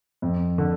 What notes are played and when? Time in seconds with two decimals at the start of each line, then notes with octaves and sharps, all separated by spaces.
0.22 F2
0.58 D3